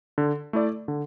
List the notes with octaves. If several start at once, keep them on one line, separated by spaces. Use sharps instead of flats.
D3
A3 E4 D5
D3